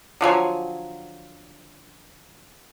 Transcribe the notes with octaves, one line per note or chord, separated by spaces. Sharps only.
D3 F3 F#3 G#5